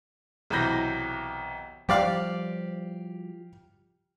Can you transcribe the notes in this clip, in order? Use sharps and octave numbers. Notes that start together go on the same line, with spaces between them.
B1 C3 E3 B5 G6 A#6
F3 G3 G4 D5 F5